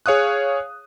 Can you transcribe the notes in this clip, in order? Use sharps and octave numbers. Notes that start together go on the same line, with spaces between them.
G#4 C#5 F5 D#6 F#6